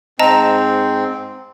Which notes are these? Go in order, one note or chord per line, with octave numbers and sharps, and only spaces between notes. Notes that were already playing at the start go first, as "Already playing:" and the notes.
G#2 C4 D#5 A5 A#5